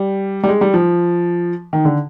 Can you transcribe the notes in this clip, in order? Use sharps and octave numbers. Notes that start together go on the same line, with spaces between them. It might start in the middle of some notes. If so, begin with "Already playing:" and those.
Already playing: G3
G3
G#3
G3
F3
D#3
D3